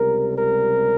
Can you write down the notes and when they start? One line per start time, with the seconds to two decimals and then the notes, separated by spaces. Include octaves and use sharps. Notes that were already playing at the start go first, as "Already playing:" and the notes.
Already playing: C#2 C3 G3 A#4
0.37 A#4